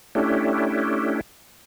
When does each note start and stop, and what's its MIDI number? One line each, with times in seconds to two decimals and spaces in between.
0.15 1.21 57
0.15 1.21 61
0.15 1.21 62
0.15 1.21 64
0.15 1.21 67